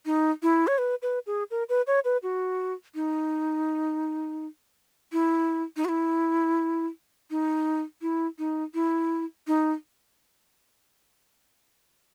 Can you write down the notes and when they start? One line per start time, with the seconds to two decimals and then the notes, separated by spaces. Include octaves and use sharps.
0.06 D#4
0.42 E4
0.67 C#5
0.78 B4
1.02 B4
1.26 G#4
1.51 A#4
1.69 B4
1.87 C#5
2.04 B4
2.23 F#4
2.95 D#4
5.12 E4
5.76 D#4
5.85 F#4
5.88 E4
7.30 D#4
8.02 E4
8.38 D#4
8.74 E4
9.47 D#4